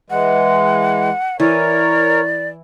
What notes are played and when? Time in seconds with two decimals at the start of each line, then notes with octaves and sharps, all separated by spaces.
0.10 E3 G#3 F#5
1.40 E3 A#4 C#5 D5